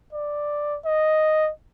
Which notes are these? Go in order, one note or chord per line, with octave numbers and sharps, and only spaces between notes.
D5
D#5